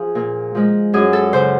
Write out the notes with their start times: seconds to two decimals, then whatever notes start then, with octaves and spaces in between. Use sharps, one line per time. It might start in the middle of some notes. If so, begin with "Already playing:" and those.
Already playing: F3 G#4
0.15 A#2
0.55 F3 G#3
0.93 F#2 G#4
1.13 A4
1.33 C#3 F#3 C5